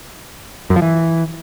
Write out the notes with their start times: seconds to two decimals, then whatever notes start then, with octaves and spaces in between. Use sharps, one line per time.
0.70 F#2
0.76 F3
0.82 E3